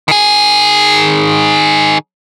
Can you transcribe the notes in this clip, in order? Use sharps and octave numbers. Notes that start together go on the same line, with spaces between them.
D#3 G#4